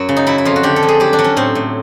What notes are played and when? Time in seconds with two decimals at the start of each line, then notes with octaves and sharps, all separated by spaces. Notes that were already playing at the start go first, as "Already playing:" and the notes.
Already playing: F#2 F#3
0.09 C#3
0.16 D#4
0.27 F#3 E4
0.38 E4
0.45 F2 F4
0.56 F#4
0.63 D3 G4
0.76 A4
0.83 F2
0.88 G#4
1.00 F#3 G4
1.13 D4
1.19 F#3
1.24 C#4
1.37 A2 C4
1.55 A2